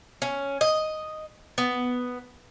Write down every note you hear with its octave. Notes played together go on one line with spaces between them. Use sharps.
C#4
D#5
B3